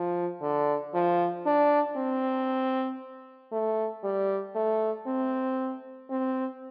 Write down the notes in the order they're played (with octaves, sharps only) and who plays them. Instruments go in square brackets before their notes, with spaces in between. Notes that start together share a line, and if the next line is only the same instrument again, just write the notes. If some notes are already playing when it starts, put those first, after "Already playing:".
Already playing: [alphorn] F3
D3
F3
D4
C4
A3
G3
A3
C4
C4